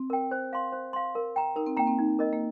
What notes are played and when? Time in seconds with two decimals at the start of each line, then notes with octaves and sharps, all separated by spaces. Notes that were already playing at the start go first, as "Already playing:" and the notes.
Already playing: C4
0.10 A#4 G5
0.31 C5
0.53 F5 C6
0.72 C5
0.93 F5 C6
1.15 A#4
1.36 G5 A#5
1.56 D#4 A#4
1.66 C4
1.77 A#3 G5 A#5
1.87 C4
1.99 D#4
2.19 A#4 D#5
2.33 A#3